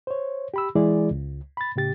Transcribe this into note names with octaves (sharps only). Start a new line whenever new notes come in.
C5 C#5
G4 B5 E6
E3 G#3 E4 G#4 D5
C#2
B5 A6
A2 C#3 G4 A6